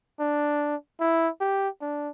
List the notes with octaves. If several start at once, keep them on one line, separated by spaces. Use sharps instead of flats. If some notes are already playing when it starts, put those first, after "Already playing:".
D4
E4
G4
D4